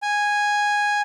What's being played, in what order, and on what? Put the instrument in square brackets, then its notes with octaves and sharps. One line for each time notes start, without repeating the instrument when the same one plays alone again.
[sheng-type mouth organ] G#5